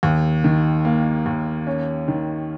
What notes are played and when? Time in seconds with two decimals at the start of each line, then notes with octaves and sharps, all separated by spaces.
0.03 D#2
0.44 D#3
0.85 A#3
1.26 D#2
1.67 C#4
2.08 D#3